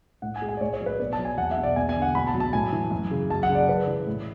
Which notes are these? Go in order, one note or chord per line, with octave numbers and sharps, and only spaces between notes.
A2 F#5
G#5
G#3
G#5
D5
A2 C#5
C#5
F#3
B4
B2 D5
A5
F#3
G#5
E2 F#5
E5
B2
D5
E2 G#5
G#5
D3
F#5
B2 B5
A5
F#3
A5
A2 G#5
E3
F#2
C#3
F#2 A5
F#5
C#3
D5
C#3 B4
E3
A2